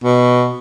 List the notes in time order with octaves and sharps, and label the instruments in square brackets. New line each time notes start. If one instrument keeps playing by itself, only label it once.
[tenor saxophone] B2